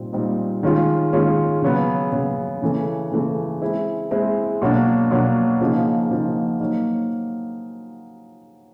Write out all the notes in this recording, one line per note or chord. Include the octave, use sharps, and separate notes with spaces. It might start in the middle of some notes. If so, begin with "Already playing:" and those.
Already playing: A#2 G3 C4 D#4
A#2 G3 C4 D#4
D#3 G#3 C#4 F4
D#3 G#3 C#4 F4
C#3 F#3 B3
C#3 F#3 B3
C#3 E3 A3
C#3 E3 A3
G#3 C4 E4
G#3 C4 E4
B2 F#3 A#3 D4
B2 F#3 A#3 D4
C#3 F3 A#3 D#4
C#3 F3 A#3 D#4
F#3 A#3 D#4